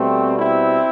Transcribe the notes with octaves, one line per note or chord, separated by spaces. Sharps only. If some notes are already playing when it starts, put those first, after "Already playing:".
Already playing: B2 G3 A3 C4
C4 E4